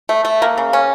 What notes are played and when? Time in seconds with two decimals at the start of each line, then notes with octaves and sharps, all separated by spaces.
0.09 A3
0.25 A3
0.42 A#3
0.58 C#3
0.73 C#4